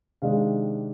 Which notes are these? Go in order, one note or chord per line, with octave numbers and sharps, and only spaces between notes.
C3 D#3 G#3 D4 F5